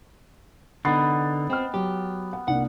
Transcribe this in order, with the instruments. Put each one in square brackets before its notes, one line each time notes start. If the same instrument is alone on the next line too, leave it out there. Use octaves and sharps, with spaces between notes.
[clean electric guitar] D3 D#4 [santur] B3 [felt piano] B5 A6 C7
[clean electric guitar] C4 [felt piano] D#5 G5 F6
[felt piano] F#3 [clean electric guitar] G4
[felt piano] F#5
[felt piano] C2 A#3 D4 [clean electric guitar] F#5